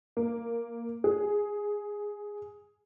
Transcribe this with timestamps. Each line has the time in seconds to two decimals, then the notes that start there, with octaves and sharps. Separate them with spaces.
0.17 A#3
1.04 G#4